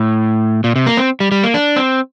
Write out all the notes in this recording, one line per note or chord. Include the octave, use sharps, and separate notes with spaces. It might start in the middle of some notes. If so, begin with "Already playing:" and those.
Already playing: A2
A#2
C3
A#3
C4
G3
G3
A#3
D4
C4